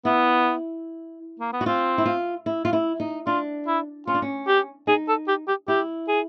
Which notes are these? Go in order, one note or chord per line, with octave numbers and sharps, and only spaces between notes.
B3 E4
A#3
B3
F#4
C4 F4
E4
F4
E4
F4
E4
D#4
D4 F4
E4
C#4 F4
D4
C#4
G4
D#4 G#4
A4
G4
G4
E4 G4
G#4